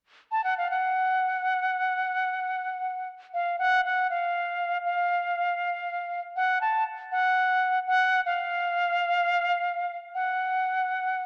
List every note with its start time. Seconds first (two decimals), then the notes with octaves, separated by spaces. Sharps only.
0.32 A5
0.44 F#5
0.58 F5
0.70 F#5
3.34 F5
3.59 F#5
3.85 F#5
4.10 F5
4.85 F5
6.36 F#5
6.61 A5
7.12 F#5
7.87 F#5
8.26 F5
10.15 F#5